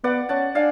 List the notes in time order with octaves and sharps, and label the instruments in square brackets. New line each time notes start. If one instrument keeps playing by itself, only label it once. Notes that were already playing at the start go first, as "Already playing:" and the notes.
[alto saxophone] B3 [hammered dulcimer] D5 F#5
[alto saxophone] C#4 [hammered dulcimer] F#5 A5
[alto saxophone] D4 [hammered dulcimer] F5 G#5